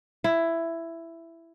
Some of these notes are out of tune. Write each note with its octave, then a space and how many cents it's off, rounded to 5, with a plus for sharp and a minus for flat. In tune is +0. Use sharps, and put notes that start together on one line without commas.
E4 +10